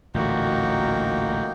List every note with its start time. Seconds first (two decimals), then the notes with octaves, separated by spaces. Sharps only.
0.15 A1 D2 A#2 A#3 D#4 F#4 G5